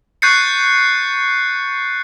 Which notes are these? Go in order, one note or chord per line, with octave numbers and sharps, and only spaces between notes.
C#6 F#6 G6 A6 C7 C#7